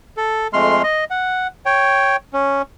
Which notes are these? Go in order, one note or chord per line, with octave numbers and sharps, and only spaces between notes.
A4
F2 G#3 A3 C6 F6
D#5
F#5
C#5 G5
C#4